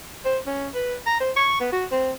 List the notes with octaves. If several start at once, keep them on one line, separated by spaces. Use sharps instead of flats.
C5
C#4
B4
A#5
C5
C#6
B3
F#4
C4